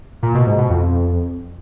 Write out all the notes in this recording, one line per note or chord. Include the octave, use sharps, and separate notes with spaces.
A#2
B2
G#2
B2
F2